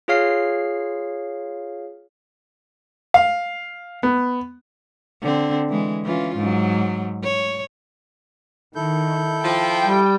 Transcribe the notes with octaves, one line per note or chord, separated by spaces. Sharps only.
F4 G#4 C#5 F5 F6 C7
F5
B3
D3 C4
E3 G#3
E3 C#4 F4
G#2 F#3
C#5
D#3 E4 A4 G6
F3 G5
G3